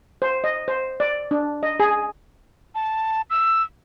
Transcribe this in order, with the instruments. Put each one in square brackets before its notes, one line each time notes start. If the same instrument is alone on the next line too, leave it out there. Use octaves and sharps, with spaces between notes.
[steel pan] C5
D#5
C5
D5
D4
D#5
G#4
[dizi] A5
E6